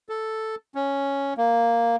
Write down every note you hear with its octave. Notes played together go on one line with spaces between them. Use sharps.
A4
C#4
A#3